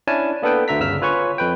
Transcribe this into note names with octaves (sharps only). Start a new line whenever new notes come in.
C#4 D4 E4 G#5 A5
A#3 B3 D4 A4 B4 G5
D2 D3 E5 A#5 B6
G1 C#3 E6 F6 B6
F4 B4 C#5 G#5 C#6
F2 B4 G5